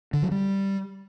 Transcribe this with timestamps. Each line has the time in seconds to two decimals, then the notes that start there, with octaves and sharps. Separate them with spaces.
0.13 D3
0.22 F#3
0.31 G3